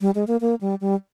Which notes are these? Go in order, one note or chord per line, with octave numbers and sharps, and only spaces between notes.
G3
G#3
A#3
A#3
G3
G3